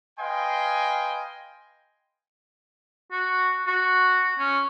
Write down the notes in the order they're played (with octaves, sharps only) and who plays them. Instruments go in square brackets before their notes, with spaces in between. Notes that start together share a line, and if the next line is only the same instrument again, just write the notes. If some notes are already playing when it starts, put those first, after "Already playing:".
[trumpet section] B4 D#5 F5 G5 G#5 C6
[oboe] F#4
F#4
C#4